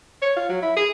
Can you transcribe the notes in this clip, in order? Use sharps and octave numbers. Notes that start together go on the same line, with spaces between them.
C#5
F4
F#3
E4
G#4